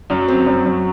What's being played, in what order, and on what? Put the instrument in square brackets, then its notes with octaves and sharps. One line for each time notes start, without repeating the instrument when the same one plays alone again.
[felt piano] F#2 [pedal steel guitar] F#3
[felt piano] C4
F#2
F#2